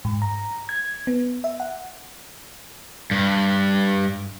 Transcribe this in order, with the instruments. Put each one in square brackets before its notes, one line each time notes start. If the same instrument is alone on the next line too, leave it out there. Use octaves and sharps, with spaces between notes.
[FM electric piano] G#2
A#5
G#6
B3
E5
F#5
[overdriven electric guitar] G2